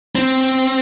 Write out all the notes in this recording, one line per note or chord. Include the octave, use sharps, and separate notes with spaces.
C4